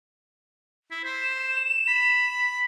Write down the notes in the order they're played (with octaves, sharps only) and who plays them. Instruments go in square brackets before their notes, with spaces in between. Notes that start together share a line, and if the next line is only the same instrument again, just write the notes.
[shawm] E4
[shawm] C5 [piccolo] B6
[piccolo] E7
[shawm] B5